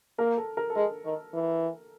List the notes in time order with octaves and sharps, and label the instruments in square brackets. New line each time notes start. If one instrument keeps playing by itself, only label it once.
[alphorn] A#3 [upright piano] A#4
[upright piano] A4
A#4
A4
[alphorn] G#3 [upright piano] A#4
[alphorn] D#3
E3